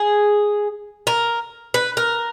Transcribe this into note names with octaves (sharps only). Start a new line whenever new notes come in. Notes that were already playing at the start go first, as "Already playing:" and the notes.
Already playing: G#4
A#4
B4
A#4